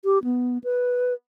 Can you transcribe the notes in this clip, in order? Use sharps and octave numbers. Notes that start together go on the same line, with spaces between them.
G4
B3
B4